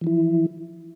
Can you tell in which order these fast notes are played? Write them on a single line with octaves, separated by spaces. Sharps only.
E3 F3 E4